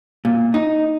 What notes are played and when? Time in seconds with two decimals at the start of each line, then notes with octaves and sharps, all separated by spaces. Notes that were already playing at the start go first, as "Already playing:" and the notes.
0.25 A#2
0.54 D#4